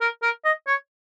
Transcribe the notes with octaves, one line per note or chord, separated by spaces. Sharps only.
A#4
A#4
D#5
C#5